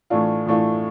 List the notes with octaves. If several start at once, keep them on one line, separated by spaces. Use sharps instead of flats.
A2 E3 A3 D4 F4
A2 E3 A3 D4 F4